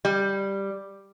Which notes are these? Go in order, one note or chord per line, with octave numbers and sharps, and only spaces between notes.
G3